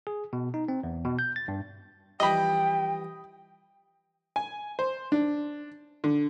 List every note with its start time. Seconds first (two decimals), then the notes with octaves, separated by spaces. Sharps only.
0.07 G#4
0.33 B2
0.54 D#4
0.68 C4
0.83 E2
1.05 B2
1.19 G6
1.36 A6
1.48 G2
2.20 E3 F3 G3 D#5 G5 B5
4.36 G#5
4.79 C5
5.12 D4
6.04 D3